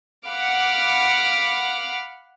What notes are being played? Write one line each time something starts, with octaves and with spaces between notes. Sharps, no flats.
F5 F#5 B5 D6 F6